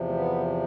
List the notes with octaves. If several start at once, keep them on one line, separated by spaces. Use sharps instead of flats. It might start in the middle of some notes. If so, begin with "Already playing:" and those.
Already playing: E2 C3 F3
A3
B3